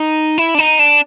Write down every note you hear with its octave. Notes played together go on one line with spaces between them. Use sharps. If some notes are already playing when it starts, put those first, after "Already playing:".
Already playing: D#4
E4
D4
D#4
D4